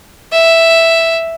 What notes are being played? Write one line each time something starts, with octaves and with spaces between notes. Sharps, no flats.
E5